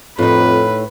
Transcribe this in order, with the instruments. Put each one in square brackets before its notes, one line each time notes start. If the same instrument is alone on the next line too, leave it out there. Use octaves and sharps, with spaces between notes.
[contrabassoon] F2 [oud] A2 D#4 [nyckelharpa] B4